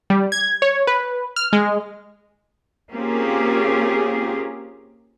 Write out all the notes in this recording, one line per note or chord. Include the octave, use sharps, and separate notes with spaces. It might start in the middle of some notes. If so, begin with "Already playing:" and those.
G3
G#6
C#5
B4
F6
G#3
A#3 C4 C#4 F4 G4 G#4